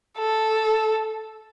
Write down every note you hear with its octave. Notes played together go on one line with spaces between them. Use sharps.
A4